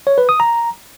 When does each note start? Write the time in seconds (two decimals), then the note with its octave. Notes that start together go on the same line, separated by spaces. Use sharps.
0.07 C#5
0.18 B4
0.29 D#6
0.40 A#5